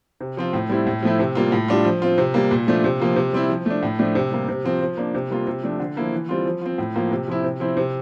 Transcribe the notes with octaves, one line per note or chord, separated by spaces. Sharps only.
C3
F3 C4 F4
A2
G3 C4 E4
A2
F3 A3 E4
C3
G3 A#3 F4
A2
G3 D4 F4
F3
C4 F4
C3
G3 A#3
A#2
F3 A3 D4 F4
C3
F3 A#3 F4
C3
G3 C4 E4
F3
A3 D4
A2
F3 A3 D4
C3
G3 A#3
C3
F3 C4 F4
F3
A#3 D4
C3
G3 A#3 F4
C3
F3 A3 D4
D3
F3 A#3 E4
E3
G3 C4 F4
F3
C4 F4
A2
F3 A#3 F4
C3
F3 C4 E4
C3
F3 C4 E4
C3